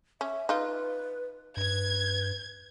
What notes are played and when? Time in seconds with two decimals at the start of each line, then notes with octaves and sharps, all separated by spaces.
0.21 C#4 E5
0.49 D#4 F4 B4
1.57 G2 B4 G#6